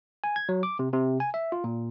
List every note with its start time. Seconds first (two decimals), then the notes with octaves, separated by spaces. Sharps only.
0.24 G#5
0.36 G#6
0.49 F#3
0.63 D6
0.79 C3
0.93 C3
1.20 G#5
1.34 E5
1.52 F4
1.64 A#2